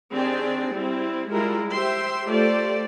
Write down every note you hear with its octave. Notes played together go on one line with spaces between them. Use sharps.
D#3 C4 D4 G4 G#4 D5
G3 C4 E4
G3 G#3 E4 F4 A#4
G4 C5 E5 G5 C6
A3 F4 G4 A4 C5 D5